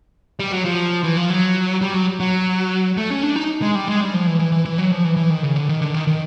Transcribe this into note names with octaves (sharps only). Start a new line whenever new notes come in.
G3
F#3
F3
E3
F3
F#3
G3
F#3
F#3
A3
C#4
D4
D#4
G#3
G3
G#3
G3
F3
E3
E3
E3
E3
F#3
F3
E3
E3
D#3
C#3
D3
D#3
D3
D#3
D#3